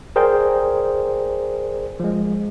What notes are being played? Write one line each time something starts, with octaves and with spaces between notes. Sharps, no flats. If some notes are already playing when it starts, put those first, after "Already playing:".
G#4 A#4 C5 D5 G5
F3 G#3